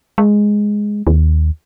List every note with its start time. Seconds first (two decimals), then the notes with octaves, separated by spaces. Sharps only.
0.18 G#3
1.07 D#2